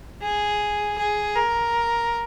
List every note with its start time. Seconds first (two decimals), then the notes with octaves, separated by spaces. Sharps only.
0.22 G#4
0.98 G#4
1.36 A#4